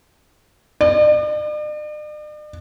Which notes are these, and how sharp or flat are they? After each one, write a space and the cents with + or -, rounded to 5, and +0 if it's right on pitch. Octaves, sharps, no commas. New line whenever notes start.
D5 +45